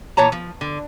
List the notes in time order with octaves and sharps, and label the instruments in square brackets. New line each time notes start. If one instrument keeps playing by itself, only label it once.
[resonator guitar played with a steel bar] A#2 E3 C#5 A5 A#5
F3
D3